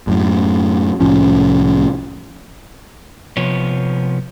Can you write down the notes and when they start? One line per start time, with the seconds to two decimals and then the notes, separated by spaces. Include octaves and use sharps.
0.07 F#2 A2
1.00 C2 A2 F3 C#4
3.37 C3 F3 B3 C#5